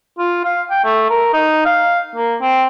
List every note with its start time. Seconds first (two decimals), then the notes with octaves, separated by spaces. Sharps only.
0.18 F4
0.45 F5
0.70 G5
0.84 A3
1.10 A#4
1.33 D#4
1.66 F5
2.16 A#3
2.41 C4